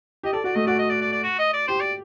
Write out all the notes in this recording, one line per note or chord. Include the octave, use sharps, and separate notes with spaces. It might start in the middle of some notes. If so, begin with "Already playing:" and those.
G4 D#5
A4 D5
F#4 D5
A3 D#5
F#4 D5
D#5
D5
D5
D5
F#4
D#5
D5
G4 C5
D5